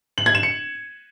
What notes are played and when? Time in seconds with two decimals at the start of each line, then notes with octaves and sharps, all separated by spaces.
0.18 F#7
0.26 G#6
0.35 E7
0.43 C#7